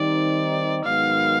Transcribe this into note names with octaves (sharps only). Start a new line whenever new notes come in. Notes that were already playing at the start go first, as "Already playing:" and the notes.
Already playing: D#3 G3 C4 D#4 D5
G#2 D#3 F#3 B3 F5